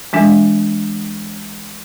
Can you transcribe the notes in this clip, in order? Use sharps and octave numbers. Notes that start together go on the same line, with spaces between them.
E3 G#3 D4